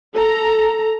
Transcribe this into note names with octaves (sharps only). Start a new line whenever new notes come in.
A4 A#5